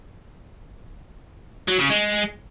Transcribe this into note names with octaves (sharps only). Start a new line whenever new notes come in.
F#3
C#3
G#3